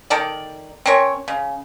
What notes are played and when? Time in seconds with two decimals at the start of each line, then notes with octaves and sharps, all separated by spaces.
0.10 D#3 A4 A#4 D5
0.86 C4 C#4 A#4 C#5
1.28 C#3